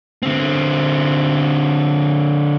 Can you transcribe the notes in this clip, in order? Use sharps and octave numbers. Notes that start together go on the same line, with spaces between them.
D3 C4